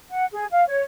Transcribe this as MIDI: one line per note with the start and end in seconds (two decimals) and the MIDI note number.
0.10 0.25 78
0.33 0.46 68
0.52 0.64 77
0.68 0.83 73